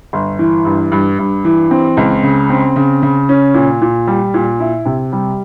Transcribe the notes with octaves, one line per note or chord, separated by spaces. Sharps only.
G1
E3
G2
G2
G2
E3
C4
C#2
C#3
C4
C#3
C#3
C#4
A#2
A#2
G3
A#2
E4
C3
G3